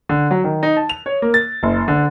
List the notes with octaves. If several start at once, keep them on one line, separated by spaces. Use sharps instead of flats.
D3
F#3
D#3
D#4
A5
F7
C#5
A#3
A6
F#1
D3